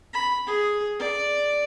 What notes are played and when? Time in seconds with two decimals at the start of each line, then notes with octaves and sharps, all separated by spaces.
0.13 B5
0.46 G#4
1.00 D5